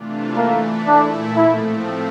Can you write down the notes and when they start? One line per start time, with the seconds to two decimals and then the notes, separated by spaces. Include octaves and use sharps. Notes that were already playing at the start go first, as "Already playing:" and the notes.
Already playing: C3 E3 A3 D4 F4
0.36 E3 A3 A#3 E4
0.86 A#2 A3 D4 E4
1.34 A2 F3 A3 C4 E4